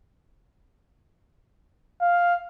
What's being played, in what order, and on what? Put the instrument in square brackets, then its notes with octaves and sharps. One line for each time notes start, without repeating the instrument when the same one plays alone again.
[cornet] F5